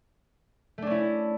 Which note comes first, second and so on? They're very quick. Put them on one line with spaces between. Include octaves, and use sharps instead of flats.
A3 D4 C#4 E4